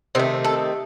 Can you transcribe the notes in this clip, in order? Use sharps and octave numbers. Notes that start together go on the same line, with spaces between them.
C3 D#3 A3 C4
A4